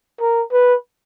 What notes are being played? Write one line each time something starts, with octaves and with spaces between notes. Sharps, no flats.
A#4
B4